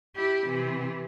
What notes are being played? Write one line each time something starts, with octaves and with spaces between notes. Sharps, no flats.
E4 G4
C3 E3